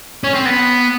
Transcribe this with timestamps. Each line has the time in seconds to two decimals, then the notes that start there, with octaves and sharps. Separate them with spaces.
0.24 C#4
0.34 C4
0.46 B3